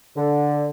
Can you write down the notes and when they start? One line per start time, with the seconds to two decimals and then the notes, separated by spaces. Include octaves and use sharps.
0.17 D3